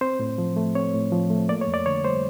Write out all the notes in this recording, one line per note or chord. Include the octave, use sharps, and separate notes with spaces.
C4 C5
A2
F3
A3
C4 C#5
A2
F3
A3
A#3 D5
C#5
F2
D5
D3 C#5
G3 C5